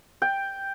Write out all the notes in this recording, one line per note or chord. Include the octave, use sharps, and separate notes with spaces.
G5